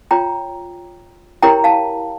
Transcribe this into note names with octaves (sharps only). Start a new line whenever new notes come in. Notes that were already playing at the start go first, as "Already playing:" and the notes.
F4 C#5 G5 A#5
E4 G4 A#4 C#5 G5 A#5
F5 A5